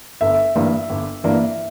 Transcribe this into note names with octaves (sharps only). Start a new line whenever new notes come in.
G1 E5
G2 E3 A#3 D4
G1
G2 E3 A#3 D4